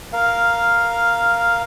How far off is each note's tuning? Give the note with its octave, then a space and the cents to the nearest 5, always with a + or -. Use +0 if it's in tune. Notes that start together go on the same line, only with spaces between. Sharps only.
A#4 +0 F5 +0